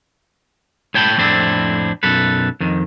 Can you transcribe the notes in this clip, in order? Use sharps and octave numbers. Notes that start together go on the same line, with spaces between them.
A2 C#5 G5 A5 B5
F2 A2 C4 D4 E4
B1 F#2 A4 B4
F2 D#3